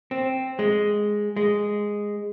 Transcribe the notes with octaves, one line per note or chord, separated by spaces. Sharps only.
C4
G#3
G#3